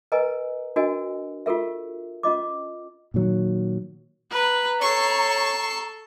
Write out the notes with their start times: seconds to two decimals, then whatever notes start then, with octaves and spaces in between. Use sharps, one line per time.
0.12 A#4 B4 D#5 G#5 A#5
0.76 D4 F#4 A#4 D#5 G#5
1.46 F4 G4 A4 A#4 E5
2.23 C#4 F4 D#5 D6
3.14 A#2 D#3 F#3
4.32 B4 A#5
4.81 A4 C#5 C#6 C7